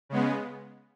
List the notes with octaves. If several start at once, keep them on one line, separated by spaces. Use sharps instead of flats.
C#3 G#3 B3